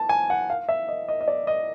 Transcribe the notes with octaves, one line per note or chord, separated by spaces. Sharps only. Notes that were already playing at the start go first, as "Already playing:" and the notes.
Already playing: A5
G#5
F#5
F5
E5
D#5
D#5
D#5
D5
D#5